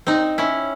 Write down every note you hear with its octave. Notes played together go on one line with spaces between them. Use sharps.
C4 D#4
C#4 E4